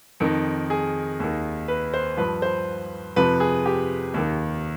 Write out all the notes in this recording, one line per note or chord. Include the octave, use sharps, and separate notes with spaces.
F2 D#3
G#4
D#2 D#3
B4
C5
G2 F3 B4
C5
F2 C3 F3 B4
G#4
G4
D#2 D#3